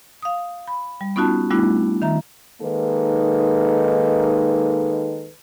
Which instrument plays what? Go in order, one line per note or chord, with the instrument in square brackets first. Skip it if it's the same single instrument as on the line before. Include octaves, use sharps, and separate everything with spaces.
[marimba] F5 D#6
B5
G3
B3 C#4 D#4 F4 F#4 A5
G3 A3 B3 D4 E4 F#4
D#3 E5 A#5
[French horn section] D#3 G#3 A#3 D#4 A4 B4